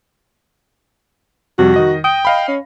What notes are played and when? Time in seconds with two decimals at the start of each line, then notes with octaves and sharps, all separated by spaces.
1.59 F2 C3 G3 F#4
1.74 D#3 D#5 A#6
2.04 G5 D#6
2.25 D#5 F5 B5
2.48 C#4